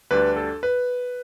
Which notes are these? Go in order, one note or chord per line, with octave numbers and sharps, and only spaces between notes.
D2 D3 G3 D4 B4
A4
B4